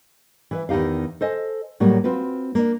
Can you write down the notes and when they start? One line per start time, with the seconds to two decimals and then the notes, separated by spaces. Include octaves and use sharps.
0.51 E3 B4 E5
0.69 E2 D#3 D#4 G4 F5
1.21 A4 C5 D#5 G#5
1.80 A2 F#3 G3 A#3
2.04 C4 F4 F#4 B4
2.55 A#3 D4